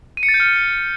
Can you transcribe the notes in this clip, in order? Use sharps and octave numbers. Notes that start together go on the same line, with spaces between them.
D#7
C#7
A6
G6
F6